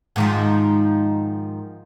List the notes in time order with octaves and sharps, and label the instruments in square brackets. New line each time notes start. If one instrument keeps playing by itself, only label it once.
[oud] G#2 D#3 F3